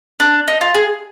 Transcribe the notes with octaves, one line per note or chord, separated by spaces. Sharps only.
D4
D#4
F4
G#4